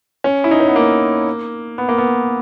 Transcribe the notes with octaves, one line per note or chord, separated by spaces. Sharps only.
C#4
E4
D#4
C#4
B3
A#3
B3
A#3
B3